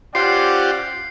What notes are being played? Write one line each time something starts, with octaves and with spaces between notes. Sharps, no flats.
C#4 F4 G4 C5 D5 F#5 C7